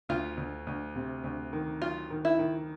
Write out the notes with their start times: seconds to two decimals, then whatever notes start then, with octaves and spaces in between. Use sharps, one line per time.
0.09 D2 F4
0.37 D2
0.67 D2
0.96 C3
1.24 D2
1.53 D#3
1.81 F#3 F4
2.10 D#3
2.25 E4
2.39 D#3